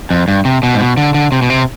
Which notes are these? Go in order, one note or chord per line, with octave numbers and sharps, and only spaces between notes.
F2
G2
C3
B2
G#2
B2
D3
D3
C3
B2
C3